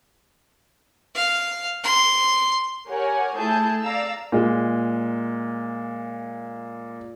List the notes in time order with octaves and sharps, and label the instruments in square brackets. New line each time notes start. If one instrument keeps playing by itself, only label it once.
[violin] F5
C6
[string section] G4 A#4 C#5 F#5 G#5
A3 E4 G#4 A5 G6
D5 F5 A#5 E6
[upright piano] A#2 G#3